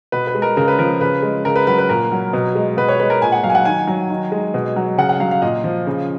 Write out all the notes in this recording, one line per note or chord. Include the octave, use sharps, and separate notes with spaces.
B2 B4
B4
G#3
A#4
C#3 A#4
B4
F3 A#4
C#3 B4
G#3
C#3 A#4
B4
F#3 B4
B4
A#2 A#4
F#3
B2
G#3
B2 B4
C#5
G#3 B4
A#4
A#2 G#5
F#5
F#3 F5
G#5
F#5
D#3 G#5
F#3
D#3
G#3
B2
F#3
C#3 F#5
F#5
F#3 F5
F5
A#2 D#5
F3
C#3